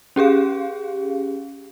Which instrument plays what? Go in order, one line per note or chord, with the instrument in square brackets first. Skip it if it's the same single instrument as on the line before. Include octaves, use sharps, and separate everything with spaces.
[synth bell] C#4 G4 G#4 F5